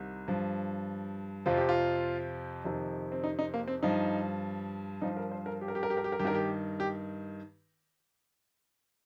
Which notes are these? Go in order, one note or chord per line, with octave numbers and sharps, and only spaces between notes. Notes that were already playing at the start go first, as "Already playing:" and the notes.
Already playing: C2 C3 D#3
G2 F3
F2 C3 F3 F4
G4
F4
F2 C3 D#3
C4
D#4
D#4
A#3
C4
G2 F3 D#4
G2 F3 D#4
A#4
C5
A#4
G4
A#4
G4
A#4
G4
A#4
G4
A#4
G2 G4
D#3 A#4
G4
G4